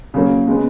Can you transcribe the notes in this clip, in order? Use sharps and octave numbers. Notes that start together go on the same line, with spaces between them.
C#3 F#3 A#3
C#3 G#3 B3